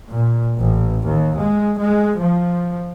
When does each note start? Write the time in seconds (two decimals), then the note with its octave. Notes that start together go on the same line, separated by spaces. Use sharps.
0.11 A#2
0.57 A1
1.06 D#2
1.38 G#3
1.78 G#3
2.19 F3